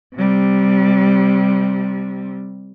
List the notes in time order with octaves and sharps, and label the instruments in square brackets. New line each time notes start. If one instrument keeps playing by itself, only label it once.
[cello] C3 G3